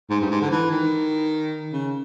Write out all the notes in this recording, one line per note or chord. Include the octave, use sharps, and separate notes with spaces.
G#2
G2
G#2
D3
E3
D#3
C#3